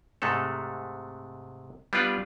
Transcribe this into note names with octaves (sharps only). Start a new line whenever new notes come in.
G#2 C3 G#3 A3 A4
G3 B3 D4 F4 B4 D5